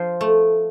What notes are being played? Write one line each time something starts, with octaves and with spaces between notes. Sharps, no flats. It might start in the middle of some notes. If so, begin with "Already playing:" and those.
Already playing: F3 C5
A3